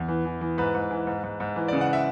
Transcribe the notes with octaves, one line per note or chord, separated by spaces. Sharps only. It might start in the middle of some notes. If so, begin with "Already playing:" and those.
Already playing: E2
E3
E3
E3
G#2 B4
G#2
E3
G#2
G#2
G#2
E3
C#3 D5
F#5
E5